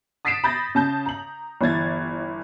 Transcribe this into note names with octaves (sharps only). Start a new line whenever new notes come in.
D#6 A6 B6 C7 D7 E7
B5 G6 A6 A#6
C#3 A5 G6
A#5 F#7
G1 E3 G#6 A6